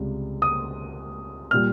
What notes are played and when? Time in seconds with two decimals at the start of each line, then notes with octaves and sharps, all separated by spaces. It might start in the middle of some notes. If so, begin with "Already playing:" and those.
Already playing: C#2 C3 G3
0.42 D#6
1.51 A#2 G3 F6